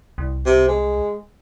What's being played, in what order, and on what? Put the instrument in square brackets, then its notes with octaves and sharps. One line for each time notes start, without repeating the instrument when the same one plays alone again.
[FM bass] C2
[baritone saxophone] C3
G#3